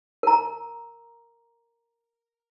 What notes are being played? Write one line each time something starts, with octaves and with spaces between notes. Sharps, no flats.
A#4 A#5